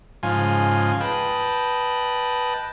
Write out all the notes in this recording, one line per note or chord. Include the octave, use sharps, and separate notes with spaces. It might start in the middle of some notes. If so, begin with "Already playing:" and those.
G#2 C#3 F3 F4 G#5
B4 D#5 G5 A5